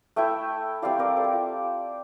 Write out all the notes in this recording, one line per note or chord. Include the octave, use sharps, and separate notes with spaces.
A3 E4 E5 G5
G3 C4 E4 D5 F5
A#4 D5
A4 C5
G4
F4